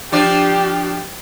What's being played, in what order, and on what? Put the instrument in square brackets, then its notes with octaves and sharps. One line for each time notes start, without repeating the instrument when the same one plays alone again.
[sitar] F3 D4 D5 [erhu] G4